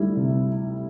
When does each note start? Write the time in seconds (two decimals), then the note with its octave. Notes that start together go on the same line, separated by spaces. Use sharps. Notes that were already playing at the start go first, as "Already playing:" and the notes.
Already playing: D2 G3 E4
0.16 C3